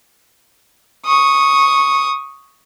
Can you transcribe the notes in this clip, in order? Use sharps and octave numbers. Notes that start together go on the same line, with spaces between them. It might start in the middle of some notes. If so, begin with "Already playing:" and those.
C#6 D#6